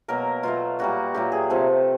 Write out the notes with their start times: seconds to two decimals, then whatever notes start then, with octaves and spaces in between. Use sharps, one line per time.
0.08 B2 F#3 A#3 A#4
0.43 B2 F#3 A3 F4
0.79 A#2 G3 A#3 F#4
1.14 A#2 F#3 A3 G4
1.32 G#4
1.50 C3 F3 A3 A4